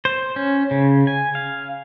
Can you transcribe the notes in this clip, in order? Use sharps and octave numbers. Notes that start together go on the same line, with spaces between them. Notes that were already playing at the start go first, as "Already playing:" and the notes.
C5
C#4
C#3
G#5
F5